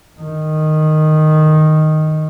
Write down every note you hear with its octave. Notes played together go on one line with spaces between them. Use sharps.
D#3